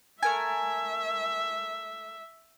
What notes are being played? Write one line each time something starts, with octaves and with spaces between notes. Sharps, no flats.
A3 A#4 E5 G#5